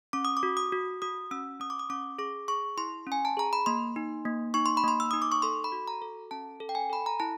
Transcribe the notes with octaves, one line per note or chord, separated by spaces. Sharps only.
C#4 D6
D#6
D6
F#4
D#6
F#4
F#4 D#6
C#4 E6
C#4 D#6
D6
D#6
C#4 D6
G#4 D6
G#4 C#6
E4 C6
C#4 G#5
A5
G#4 A#5
B5
A#3 C6
D#4
A#3
D#4 C#6
C6
B5
A#3 C6
E6
D#4 D#6
D6
C#6
A4 C6
B5
F#4
A#5
A4
C#4 A5
A4
G5
G#5
A4 B5
A#5
E4 A5